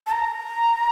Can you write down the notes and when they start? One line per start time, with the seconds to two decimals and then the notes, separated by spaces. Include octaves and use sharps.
0.07 A5
0.11 A#5